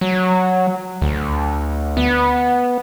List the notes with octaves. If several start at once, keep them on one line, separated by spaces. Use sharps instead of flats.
F#3
D2
B3